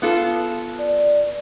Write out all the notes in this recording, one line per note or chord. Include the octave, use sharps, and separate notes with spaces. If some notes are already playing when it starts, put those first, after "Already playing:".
B3 F4 A4
D5